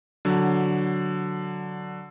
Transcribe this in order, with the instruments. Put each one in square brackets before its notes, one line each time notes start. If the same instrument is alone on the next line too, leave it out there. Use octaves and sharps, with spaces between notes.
[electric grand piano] D3 F#3